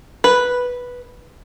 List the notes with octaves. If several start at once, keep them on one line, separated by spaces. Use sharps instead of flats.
B4